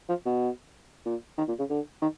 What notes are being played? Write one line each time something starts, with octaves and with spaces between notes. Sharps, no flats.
F3
B2
A#2
D#3
A#2
C#3
D3
D#3